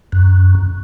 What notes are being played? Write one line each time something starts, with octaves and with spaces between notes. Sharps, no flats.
F#2